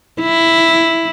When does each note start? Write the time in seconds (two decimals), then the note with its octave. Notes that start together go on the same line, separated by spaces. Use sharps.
0.21 E4